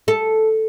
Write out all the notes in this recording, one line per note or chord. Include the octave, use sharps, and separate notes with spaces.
A4